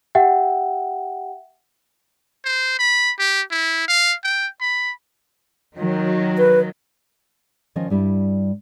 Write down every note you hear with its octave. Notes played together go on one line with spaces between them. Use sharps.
G4 E5 F#5 G5
C5
B5
G4
E4
F5
G5
B5
D#3 F#3
B4
D#3 F3 C#4 D#5
G2 G3 E4